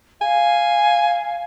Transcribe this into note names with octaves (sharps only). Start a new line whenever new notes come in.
F5 G#5